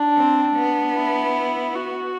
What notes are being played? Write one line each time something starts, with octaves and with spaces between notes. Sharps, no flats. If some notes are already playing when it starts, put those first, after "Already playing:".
Already playing: D4
C4
B3
E4
F#4